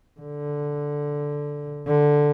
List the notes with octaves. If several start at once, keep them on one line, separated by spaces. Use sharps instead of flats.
D3
D3